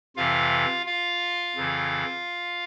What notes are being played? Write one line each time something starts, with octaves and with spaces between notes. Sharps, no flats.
F2 C3 E3 F4 F5
F4 F5
F2 C#3 E3